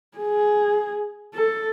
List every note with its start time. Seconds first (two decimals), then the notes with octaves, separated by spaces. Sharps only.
0.18 G#4
1.34 A4